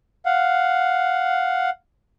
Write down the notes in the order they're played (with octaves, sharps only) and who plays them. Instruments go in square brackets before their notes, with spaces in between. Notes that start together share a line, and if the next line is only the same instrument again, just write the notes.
[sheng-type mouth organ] F5 F#5